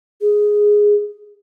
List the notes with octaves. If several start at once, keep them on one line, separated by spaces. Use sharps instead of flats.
G#4